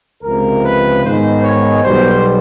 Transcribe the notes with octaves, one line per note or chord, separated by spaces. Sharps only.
C#2 C3 F3 G#3 A#4
B4
G#2 D#3 G#3 B3 C5
C#5
B1 B2 G3 C5